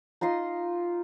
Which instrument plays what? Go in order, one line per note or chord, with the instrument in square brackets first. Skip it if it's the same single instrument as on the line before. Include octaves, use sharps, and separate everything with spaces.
[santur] D#4 F4 D#5 C6